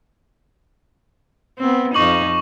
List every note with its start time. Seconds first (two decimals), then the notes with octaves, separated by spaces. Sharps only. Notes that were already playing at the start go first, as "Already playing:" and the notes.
1.58 B3 C4
1.94 F2 D#4 C#6 D6 F#7